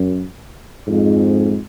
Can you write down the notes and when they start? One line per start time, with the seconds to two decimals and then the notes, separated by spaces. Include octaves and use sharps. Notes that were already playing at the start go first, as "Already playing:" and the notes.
Already playing: F#2
0.87 F2 G#2